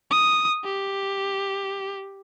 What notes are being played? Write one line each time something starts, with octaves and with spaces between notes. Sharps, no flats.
D#6
G4